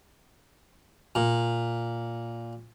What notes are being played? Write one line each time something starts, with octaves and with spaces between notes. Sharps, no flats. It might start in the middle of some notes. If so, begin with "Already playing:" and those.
A#2